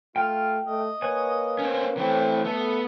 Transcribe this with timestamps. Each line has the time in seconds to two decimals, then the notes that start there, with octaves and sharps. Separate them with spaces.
0.16 A3 F4 G5 F6
0.67 A3 D#5
1.02 A#3 B4 C#5 G#5
1.59 C4 C#4
1.97 A2 E3 A3 C4
2.44 A3 B3 A4